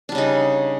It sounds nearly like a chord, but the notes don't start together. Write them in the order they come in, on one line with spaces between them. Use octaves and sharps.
D4 G3 C#3 D#4